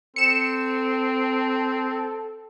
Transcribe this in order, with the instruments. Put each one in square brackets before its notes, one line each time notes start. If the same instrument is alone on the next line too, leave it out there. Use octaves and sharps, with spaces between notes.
[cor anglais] C4 [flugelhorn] A4 [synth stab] C#7 E7